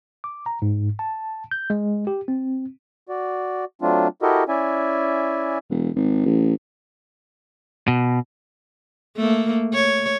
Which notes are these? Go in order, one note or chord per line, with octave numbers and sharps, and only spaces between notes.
D6
A#5
G#2
A5
G6
G#3
G4
C4
F#4 D5
F#3 A3 C4 D4 F4
E4 F#4 G4 A4 A#4 D#5
C#4 E4 D5 E5 G#5
E1
G#1
A1
B2
A3 A#3
C#5